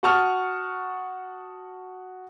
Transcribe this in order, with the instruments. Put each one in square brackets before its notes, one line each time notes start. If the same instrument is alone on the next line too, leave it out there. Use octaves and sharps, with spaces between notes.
[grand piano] F#4 F#5 A5 C#6 D#6 F6